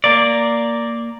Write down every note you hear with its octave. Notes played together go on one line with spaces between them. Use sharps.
A#3 D5